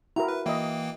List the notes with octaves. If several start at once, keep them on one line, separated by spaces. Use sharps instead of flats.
E4 F#4 A#4 A#5
B4
E3 A#3 D#5 E5 G5